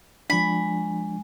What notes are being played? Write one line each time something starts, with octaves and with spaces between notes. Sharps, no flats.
F3 G#3 D4 G#5 B5